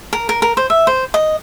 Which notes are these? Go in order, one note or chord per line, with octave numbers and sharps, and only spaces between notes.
A#4
A#4
A#4
C5
E5
C5
D#5